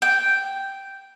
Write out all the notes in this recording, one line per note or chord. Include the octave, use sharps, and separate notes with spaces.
G5